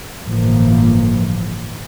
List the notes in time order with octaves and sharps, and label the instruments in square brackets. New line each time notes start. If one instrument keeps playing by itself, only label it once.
[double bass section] G1 A2 E3 F3 A#3